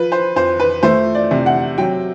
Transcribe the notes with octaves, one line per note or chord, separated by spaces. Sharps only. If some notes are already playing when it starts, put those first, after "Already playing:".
Already playing: F3 B4
C5
F2 C5
B4
A3 C5
D5
C3
F#5
F#3 G5